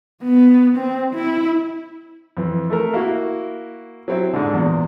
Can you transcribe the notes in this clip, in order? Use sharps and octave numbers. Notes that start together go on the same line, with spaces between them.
B3
C4
E4
F2 E3
A3 A4 A#4
A#3 E4 F#4
F#3 C4 E4
G#2 D3
E2 A#2